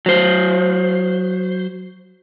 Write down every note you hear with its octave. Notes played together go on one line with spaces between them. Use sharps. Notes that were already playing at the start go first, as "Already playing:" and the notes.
F#3 C5